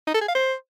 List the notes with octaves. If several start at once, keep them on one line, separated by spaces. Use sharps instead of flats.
D#4
A4
G#4
F5
C5